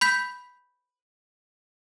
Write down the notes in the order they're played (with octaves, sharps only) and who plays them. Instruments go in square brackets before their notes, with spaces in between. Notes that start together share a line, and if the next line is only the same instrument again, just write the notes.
[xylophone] B5 G6 B6